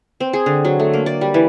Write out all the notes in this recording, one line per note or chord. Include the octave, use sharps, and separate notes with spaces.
C4
G#4
D3
F#3
A3
A#3
D5
G3
E3